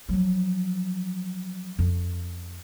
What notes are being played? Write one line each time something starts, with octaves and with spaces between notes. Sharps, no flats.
F3 F#3
F2